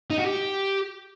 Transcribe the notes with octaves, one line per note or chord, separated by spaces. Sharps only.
D#4
F#4
G4